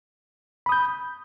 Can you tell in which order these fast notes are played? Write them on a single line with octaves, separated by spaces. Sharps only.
B5 D#6 G6